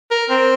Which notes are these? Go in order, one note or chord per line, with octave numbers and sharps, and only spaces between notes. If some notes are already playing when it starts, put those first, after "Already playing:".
A#4
C4